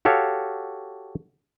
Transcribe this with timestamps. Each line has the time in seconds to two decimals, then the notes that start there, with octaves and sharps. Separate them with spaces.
0.05 F#4 G4 A4 C#5 F5